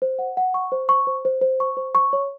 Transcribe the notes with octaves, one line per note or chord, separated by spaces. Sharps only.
C5
F#5
F#5
C#6
C5
C#6
C5
C5
C5
C#6
C5
C#6
C#5